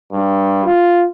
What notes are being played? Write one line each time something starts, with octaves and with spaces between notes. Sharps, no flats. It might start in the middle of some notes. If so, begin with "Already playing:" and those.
G2
F4